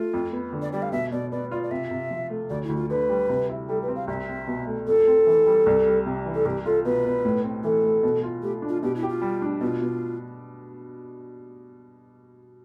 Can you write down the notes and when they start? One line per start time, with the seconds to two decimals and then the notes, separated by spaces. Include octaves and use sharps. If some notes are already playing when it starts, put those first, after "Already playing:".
Already playing: A3 F4
0.14 F2
0.33 B3
0.53 D3
0.62 D5
0.72 G3 D5
0.82 F5
0.92 B2 E5
1.11 B2 D5
1.32 B3 D5
1.51 F4 D5
1.63 D5
1.71 C3 E5
1.91 C3
2.11 F3
2.30 A3
2.50 D2 D5
2.64 E4
2.69 D2
2.76 F4
2.90 D3 B4
3.09 G3
3.29 C3
3.49 E4
3.69 G3 A4
3.82 B4
3.88 C4
3.95 F5
4.08 C2 E5
4.28 C4
4.47 B2
4.67 A3
4.87 F2 A4
5.07 C4
5.26 E3
5.46 G3
5.66 C2
5.86 G3
6.06 C3
6.26 E3
6.34 A4
6.45 C2 G4
6.65 F4 A4
6.85 B2 B4
7.04 B3
7.25 A2
7.44 C4
7.64 E3 A4
7.84 A3
8.03 B2
8.23 F4
8.42 A3 G4
8.62 D4
8.69 F4
8.83 B2 G4
8.96 E4
9.03 G4
9.09 F4
9.22 G3
9.42 D4
9.61 B2 F4
9.81 B2